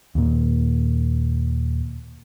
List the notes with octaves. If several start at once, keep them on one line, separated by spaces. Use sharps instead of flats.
D#2 A#2